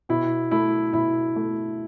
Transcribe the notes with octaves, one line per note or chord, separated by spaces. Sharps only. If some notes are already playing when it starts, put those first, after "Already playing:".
B2 E4
A3 E4
B2 E4
A3